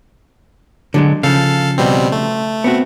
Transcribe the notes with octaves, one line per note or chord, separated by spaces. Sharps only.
D3 F#3 G#3
C#3 F3 A4 F5
B2 G3 C4
A3
B3 C4 F#4